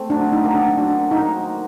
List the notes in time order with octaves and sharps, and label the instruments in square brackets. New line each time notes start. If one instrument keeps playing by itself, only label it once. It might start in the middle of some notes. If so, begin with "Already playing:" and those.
Already playing: [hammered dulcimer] A3 C4
[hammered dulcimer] F#3 [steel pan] D4
[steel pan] D#4
[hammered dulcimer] A#3 F#4 A#4
[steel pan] D4
[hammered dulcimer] F#3 [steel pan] D4
[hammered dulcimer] A#3 F#4 A#4 [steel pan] D#4